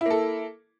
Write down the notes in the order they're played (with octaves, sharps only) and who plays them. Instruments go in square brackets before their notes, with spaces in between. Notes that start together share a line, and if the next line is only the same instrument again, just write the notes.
[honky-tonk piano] E4
A#3
A4